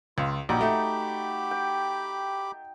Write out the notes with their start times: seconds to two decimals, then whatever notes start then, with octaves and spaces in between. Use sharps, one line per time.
0.18 C#2 F4
0.49 A#1 D#4 F#4 G4 B5 D6
0.61 A3
1.51 G5